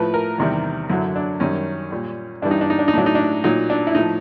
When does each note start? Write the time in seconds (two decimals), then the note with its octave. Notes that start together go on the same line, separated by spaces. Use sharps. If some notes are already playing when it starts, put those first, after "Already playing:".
Already playing: A2 F3 B4
0.14 A#4
0.38 E2 C3 D#3 G3
0.90 F#2 D3 F#3 E4
1.16 D4
1.40 F#2 D#3 G3 C#4
1.91 A#2 G3
2.42 G2 E3 G3 D4
2.51 D#4
2.61 D4
2.70 D#4
2.79 D4
2.88 D#4
2.94 A2 F#3 D4
3.06 D#4
3.15 D4
3.44 A#2 F#3 D#4
3.70 D4
3.87 E4
3.95 A2 F3 D#4